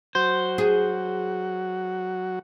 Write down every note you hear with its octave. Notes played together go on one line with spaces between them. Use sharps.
F#3 F#4 C5
G#4